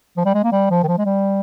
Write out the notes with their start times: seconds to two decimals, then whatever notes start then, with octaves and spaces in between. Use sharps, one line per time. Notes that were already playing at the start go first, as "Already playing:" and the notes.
0.17 F3
0.25 G3
0.34 G#3
0.44 A#3
0.52 G3
0.70 F3
0.83 D#3
0.88 F3
0.98 G#3
1.05 G3